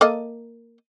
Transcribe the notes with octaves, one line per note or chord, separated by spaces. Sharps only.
A#3 A4 D#5